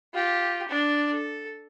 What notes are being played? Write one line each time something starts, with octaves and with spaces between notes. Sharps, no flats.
F4 G4
D4
A4